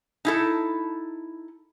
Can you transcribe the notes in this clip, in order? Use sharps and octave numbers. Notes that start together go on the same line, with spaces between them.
D#4 E4 A4